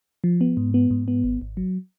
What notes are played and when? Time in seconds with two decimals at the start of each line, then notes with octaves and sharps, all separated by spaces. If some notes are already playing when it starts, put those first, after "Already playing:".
0.24 F3
0.41 B3
0.57 G#2
0.74 B3
0.91 G#2
1.08 B3
1.24 G#1
1.42 G#1
1.57 F#3